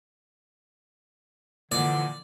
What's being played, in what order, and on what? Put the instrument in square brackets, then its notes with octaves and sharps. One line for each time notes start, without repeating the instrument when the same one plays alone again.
[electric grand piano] A#2 E3 F3 [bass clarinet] D3 [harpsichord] D5